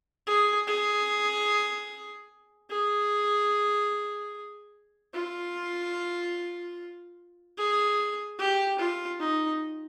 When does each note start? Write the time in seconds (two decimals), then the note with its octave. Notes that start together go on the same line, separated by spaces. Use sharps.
0.27 G#4
0.67 G#4
2.70 G#4
5.14 F4
7.57 G#4
8.39 G4
8.79 F4
9.20 D#4